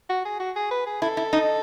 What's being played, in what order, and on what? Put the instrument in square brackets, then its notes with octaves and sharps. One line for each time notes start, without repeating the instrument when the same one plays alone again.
[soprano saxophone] F#4
G#4
F#4
G#4
B4
G#4
[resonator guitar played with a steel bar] E4 [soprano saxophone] A4
[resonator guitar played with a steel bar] E4
D#4